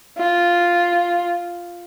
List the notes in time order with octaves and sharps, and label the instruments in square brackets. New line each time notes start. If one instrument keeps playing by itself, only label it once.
[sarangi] F4